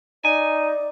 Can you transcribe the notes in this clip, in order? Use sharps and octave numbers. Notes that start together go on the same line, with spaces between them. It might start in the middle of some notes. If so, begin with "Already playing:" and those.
D#4 D5 G#5